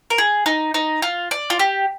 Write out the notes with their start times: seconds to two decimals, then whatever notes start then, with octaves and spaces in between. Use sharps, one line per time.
0.10 A#4
0.18 G#4
0.46 D#4
0.74 D#4
1.02 F4
1.31 D5
1.50 F4
1.59 G4